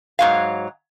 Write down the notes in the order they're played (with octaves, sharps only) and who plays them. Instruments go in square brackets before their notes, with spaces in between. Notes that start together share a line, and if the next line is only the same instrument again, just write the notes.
[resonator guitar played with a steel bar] G#2 F#3 F5